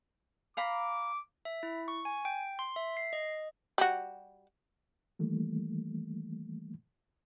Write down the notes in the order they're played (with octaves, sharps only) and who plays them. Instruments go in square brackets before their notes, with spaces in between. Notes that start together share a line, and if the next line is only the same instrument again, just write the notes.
[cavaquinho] F5 A#5 B5 [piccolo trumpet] D6
[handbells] E5
E4
C#6
G#5
G5
C6
E5
C7
D#5
[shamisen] G3 F#4
[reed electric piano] D#3 E3 G3 A3 A#3